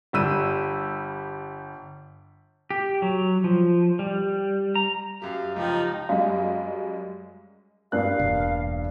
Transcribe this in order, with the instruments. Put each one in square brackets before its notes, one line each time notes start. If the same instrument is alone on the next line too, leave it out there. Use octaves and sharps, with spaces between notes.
[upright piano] G1 G3 E6 D#7
[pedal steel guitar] G4
F#3
F3
G3
A#5
[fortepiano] F#2 G4 [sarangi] F5
[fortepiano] C#2 G4 G5 [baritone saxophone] F3 [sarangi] D#4
[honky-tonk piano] F#2 G3 G#3 [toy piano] F5
[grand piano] G2 A#3 F#6 [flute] F5
[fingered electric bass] E1